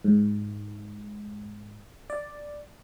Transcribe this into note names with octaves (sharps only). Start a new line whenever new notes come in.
G#2
D5